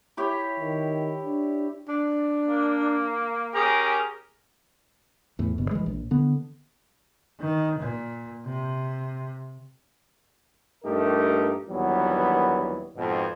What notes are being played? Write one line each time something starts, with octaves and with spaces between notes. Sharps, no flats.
E4 G4 C#5
D#3
D4
D4
A#3
C#4 G4 G#4 A#4
E2 A2
G1 B2
E3 G#3
A#1
D3 B3
D#3
A#2
C3
A#1 G2 A3 D#4 G4 A#4
A#1 D#2 E3 F#3 G3 B3
F2 G#2 B2